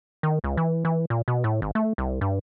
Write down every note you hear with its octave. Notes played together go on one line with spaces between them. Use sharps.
D#3
C#2
E3
E3
A#2
B2
A2
G#1
A3
C2
G2